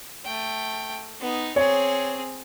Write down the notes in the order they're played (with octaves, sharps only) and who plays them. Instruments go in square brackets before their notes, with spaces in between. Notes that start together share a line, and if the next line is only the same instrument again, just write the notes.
[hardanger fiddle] A3 G5
B3 D#4
[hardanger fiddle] C4 G#4 [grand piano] C#5